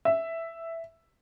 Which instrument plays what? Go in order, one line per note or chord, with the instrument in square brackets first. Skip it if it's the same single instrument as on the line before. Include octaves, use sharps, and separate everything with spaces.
[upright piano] E5